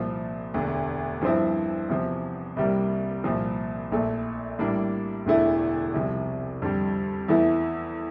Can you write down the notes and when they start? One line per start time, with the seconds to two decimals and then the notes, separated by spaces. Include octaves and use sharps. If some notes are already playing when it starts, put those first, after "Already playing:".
Already playing: C2 A#2 F3
0.54 E1 D2 D3
1.21 G2 F3 C4 E4
1.89 E2 C3 F3
2.56 C2 C3 G3 A#3
3.24 C2 A#2 F3
3.92 A#1 A#2 A3
4.59 A2 G3 A#3 D4
5.26 E1 D2 D3 A3 E4
5.94 C2 C3 F3
6.62 F2 D3 G3
7.28 E2 E3 A3 E4